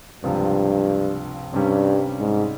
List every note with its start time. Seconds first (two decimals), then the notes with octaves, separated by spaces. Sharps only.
0.24 C#2 G2 C3 F3
1.54 G2 C3 G3 C#4
2.20 G#2